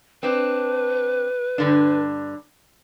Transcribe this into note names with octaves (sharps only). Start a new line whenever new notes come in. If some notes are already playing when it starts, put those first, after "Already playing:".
C4 D4 B4
G2 D3 D4